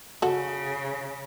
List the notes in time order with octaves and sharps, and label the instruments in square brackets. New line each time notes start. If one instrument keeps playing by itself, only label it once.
[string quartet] C#3 [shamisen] F#4 A4